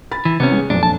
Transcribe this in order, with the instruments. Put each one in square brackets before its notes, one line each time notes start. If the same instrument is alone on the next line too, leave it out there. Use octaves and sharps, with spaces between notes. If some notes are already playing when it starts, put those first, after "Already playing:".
[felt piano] B5 A6
[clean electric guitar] E3
[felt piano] C3 [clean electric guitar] B3 C#4
[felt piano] G#3
[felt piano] F1 A#1 F#2 [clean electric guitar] D4
[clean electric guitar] A5